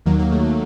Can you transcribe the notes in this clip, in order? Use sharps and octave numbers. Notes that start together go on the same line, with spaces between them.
D#2 D#3 F#3 A#3
A#3
A3
A#3